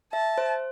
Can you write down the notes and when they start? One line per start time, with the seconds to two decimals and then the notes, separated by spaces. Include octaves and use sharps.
0.13 E5 A5
0.38 C5